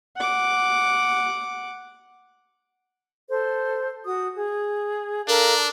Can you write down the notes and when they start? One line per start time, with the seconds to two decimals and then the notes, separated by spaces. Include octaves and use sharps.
0.17 F#5 D6
3.30 A4 C5
4.05 F#4 D#6
4.35 G#4
5.28 D4 A4 A#4 F5